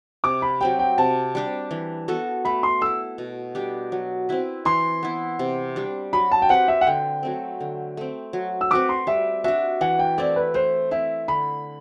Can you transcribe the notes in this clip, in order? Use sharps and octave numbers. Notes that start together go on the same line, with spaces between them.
C3 D6
B5
F#3 C4 G4 G5
G5
C3 A5
G3 D4 G4
E3
B3 F#4 A4
A3 B5
C6
E4 A4 E6
B2
G3 D4 G4
F#3
C4 E4 B4
E3 C6
B3 E4
C3
G3 D4
F#3 B5
A5
G5
C4 G4 B4 F#5
E5
F#5
D3 G5
F#3 A3 C4
D3
A3 C4
F#3
E6
C4 F#4 B4 D6
C6
G3 E5
D4 F#4 E5
E3 F#5
G5
A3 C4 E4 D5
B4
A3 C5
C4 E4 E5
D3 B5